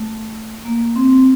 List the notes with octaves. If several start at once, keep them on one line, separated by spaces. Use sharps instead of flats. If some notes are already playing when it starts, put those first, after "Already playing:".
Already playing: A3
A#3
C4